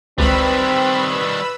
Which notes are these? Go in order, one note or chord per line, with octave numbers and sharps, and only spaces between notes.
G1 C#2 D#3 G3 C4 B4 B5 E6